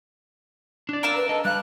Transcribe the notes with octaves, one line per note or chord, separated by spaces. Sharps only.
D4 D5
A#4 F5 E6
B4
A4 D#5 A5
G3 F5 F#6